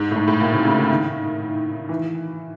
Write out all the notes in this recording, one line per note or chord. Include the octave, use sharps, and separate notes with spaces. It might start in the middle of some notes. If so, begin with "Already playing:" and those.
Already playing: G#2
A2
G#2
A2
A#2
C3
C#3
D3
D#3
E3